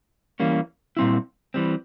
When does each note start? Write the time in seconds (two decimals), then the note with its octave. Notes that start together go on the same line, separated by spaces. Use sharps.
0.40 E3 G3 A#3 C#4
0.97 A#2 G3 C4 E4
1.54 E3 G3 C4